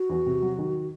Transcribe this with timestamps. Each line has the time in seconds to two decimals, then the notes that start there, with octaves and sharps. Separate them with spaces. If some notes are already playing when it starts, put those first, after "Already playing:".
Already playing: F#4
0.10 E2
0.26 C3
0.42 F#3
0.58 D#3